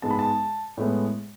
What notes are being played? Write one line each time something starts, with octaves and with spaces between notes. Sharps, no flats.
G#2 G#3 B3 A5
B5
A5
A2 G#3 B3